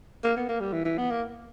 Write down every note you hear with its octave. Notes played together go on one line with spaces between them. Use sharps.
A#3
B3
A#3
G3
E3
E3
B3
A#3